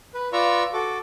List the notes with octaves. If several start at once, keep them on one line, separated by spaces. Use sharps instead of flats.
B4
F4 B4 D5 A#5 C#6 E6
F#4 A4 D6